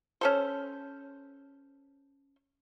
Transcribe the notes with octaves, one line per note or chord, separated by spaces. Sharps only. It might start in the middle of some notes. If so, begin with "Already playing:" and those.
C#4 A4 C5